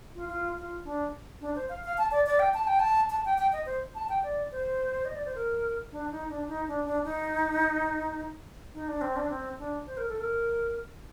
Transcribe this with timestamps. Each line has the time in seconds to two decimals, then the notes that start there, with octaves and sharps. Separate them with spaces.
0.15 F4
0.29 F4
0.57 F4
0.84 D4
1.41 D4
1.55 C5
1.69 F5
1.84 F5
1.98 A5
2.11 D5
2.26 D5
2.39 G5
2.54 A5
2.67 G5
2.79 A5
3.10 A5
3.25 G5
3.38 G5
3.52 D#5
3.66 C5
3.95 A5
4.09 G5
4.23 D5
4.52 C5
5.05 D#5
5.15 D5
5.26 C5
5.35 A#4
5.92 D4
6.11 D#4
6.29 D4
6.48 D#4
6.68 D4
6.85 D4
7.04 D#4
8.74 D#4
8.88 D4
9.01 C4
9.16 D4
9.30 C4
9.59 D4
9.86 C5
9.97 A#4
10.08 A4
10.20 A#4